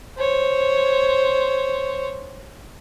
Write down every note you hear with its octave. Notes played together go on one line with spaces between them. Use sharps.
C5 C#5